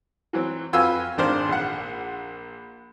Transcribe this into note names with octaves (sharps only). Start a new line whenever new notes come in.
E3 F#3 C4
F2 F4 F#4 B4 G#5 E6
G#1 D#3 D4 C5 F5
A#1 F#5